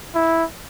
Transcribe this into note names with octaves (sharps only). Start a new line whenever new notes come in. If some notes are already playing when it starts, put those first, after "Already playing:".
E4